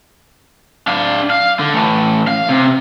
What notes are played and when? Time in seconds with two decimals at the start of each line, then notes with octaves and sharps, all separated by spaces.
0.87 D4 F5
1.30 F5
1.59 D3
1.74 E3 A3
2.28 F5
2.49 C3